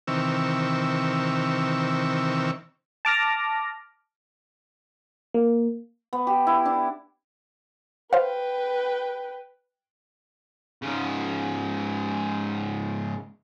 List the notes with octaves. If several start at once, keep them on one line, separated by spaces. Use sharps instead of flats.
C3 D#3 E3 C4 C#6 E6
A5 D6 F6 A#6
A#3
B3
G4
E4
D4
B4 C5 F5 G5
G#2 C#3